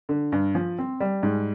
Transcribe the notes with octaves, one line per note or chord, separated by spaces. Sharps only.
D3
G2
F3
C4
G3
G#2